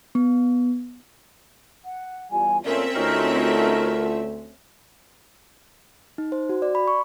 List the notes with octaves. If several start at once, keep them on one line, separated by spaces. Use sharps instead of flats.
B3
F#5
E2 G3 F4 G#5
A#2 A3 C4 C#4 A#4 D5 E5
D2 A3 D#4 F4 F#4 A#4
D#4
C5
F#4
D5
B5
C#6